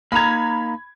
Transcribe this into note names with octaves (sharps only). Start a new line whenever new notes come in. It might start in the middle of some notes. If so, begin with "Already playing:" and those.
A#3 D#4 A#5 B5 G#6